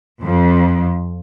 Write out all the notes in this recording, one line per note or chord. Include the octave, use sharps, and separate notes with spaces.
F2